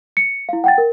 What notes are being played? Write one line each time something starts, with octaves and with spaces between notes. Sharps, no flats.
C#7
E4 F5
F#5 G5 A6
A#4